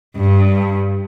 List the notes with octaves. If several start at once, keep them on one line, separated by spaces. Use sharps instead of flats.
G2